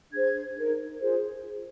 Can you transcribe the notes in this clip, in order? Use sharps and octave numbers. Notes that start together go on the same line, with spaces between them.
D4 G#4 C5 G#6
D#4 A#4
F4 G#4 C5